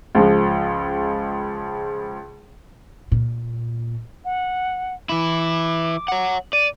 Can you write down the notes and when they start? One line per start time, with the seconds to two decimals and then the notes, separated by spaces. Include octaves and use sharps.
0.15 C#2 F3 G#3
3.12 A#2
4.25 F#5
5.09 E3 E4 D6
6.08 C#5 F#5
6.53 D5 D#7